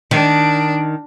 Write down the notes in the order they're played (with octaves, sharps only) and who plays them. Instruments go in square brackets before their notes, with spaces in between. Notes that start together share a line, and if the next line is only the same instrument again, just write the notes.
[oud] D#3 [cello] D4